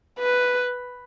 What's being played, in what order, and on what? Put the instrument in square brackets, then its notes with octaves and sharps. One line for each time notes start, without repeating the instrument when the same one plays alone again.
[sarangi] B4